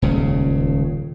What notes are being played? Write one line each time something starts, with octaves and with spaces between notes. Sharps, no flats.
D#1 C#2 C#3